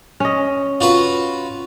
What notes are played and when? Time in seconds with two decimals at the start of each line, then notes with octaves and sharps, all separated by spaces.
0.20 C#4 D#5
0.81 F4 F#4 B4